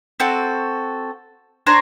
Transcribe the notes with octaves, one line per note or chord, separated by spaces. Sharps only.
C4 F#4 A4
D4 C5 C#5 A#5